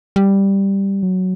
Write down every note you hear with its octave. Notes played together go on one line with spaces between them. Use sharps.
G3
F#3